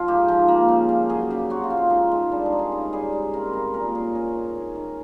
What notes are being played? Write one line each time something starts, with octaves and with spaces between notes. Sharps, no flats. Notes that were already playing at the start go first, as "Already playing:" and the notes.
Already playing: F3 F4
G#2 G4
F3
A#3
C#3
C#3
F#3 G#4
C#3 G4
C4 F#4
F4
C4
F4
G#3 D#4
G#3
G3 D4
D#4
C4
G#4
C#3
G3 G#4
G#3
C4 A#4
C4 A#4
A#2 A#4
C#4 G#4
C#4 G#4
G#2
C#4
D#3